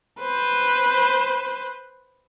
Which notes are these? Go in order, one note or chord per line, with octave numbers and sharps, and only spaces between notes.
B4 C5